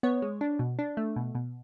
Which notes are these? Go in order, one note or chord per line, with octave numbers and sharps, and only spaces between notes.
B3 C#5
G#3
D4
B2
D4
A3
B2
B2